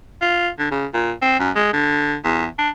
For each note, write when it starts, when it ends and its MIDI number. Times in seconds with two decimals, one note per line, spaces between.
0.22 0.49 65
0.59 0.67 50
0.71 0.86 49
0.94 1.12 46
1.22 1.39 60
1.40 1.51 42
1.56 1.70 56
1.73 2.15 50
2.25 2.46 40
2.59 2.70 62